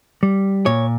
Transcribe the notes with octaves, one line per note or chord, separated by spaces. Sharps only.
G3
A#2 C#5